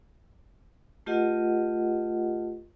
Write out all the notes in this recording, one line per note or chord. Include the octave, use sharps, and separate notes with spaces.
A3 F4 G4 A#4 D#5 F#5